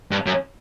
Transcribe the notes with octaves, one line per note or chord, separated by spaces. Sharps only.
G2
F#2